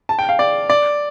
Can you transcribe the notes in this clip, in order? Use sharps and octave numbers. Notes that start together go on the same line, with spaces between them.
A5
G5
F5
D5
D5